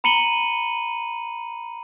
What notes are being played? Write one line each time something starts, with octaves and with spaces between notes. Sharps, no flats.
A#5 B5 C#7 D#7 F#7 G7